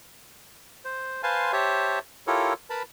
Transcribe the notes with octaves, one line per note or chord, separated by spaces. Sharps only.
C5
B4 C5 F5 G#5 A5 C6
G4 C5 C#5 E5 A5
E4 F4 G4 A4 A#4 C#5
A#4 B4 A5 B5